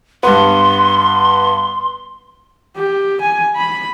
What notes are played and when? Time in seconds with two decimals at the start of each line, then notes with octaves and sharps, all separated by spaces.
0.23 G2 B3 C6
2.76 G4
3.21 G#5
3.56 B5